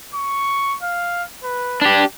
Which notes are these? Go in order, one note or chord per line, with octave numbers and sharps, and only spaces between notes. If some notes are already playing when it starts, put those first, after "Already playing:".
C#6
F5
B4
D4 G4 B4